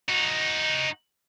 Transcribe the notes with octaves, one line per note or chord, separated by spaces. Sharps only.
D#4 F#4